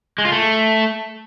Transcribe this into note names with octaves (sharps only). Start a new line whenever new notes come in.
G#3
F4
A3